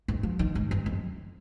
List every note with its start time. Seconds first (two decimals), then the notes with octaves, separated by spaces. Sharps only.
0.08 G#2
0.23 F3
0.39 D#3
0.55 G#2
0.71 G2
0.86 F2